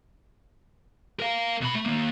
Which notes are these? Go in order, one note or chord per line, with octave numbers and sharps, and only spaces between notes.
A#4 F5
B2 B5
A3
D#3 A#3